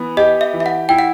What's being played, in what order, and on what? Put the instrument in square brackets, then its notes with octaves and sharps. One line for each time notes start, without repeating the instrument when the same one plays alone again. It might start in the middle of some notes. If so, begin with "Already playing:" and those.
Already playing: [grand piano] E3 B3
[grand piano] G4 [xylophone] D#5
[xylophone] E5
[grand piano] E3
[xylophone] E5
F#5
[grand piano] E4 [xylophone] G5
[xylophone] F#5